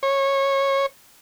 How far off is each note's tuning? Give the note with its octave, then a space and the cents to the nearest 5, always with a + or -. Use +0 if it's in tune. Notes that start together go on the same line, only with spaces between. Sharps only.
C#5 -20